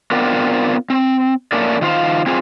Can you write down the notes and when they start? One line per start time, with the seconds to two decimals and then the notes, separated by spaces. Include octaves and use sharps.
0.11 B3 C4 D4 F4 A#4
0.90 C4
1.52 A3 A#3 C#4 D4 A#4 D5
1.81 D#3 F4 C5 F5
2.26 C4 F4 G#4